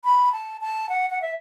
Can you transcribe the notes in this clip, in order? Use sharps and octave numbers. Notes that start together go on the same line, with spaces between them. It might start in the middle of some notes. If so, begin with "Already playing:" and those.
B5
A5
A5
F#5
F#5
E5